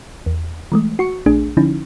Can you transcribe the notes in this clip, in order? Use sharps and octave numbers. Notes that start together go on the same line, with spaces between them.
E2
E3 G#3 A3
F#4 C#6 C#7
A#1 A3 D4 G#4
D3 F3 C#4 D#4 E4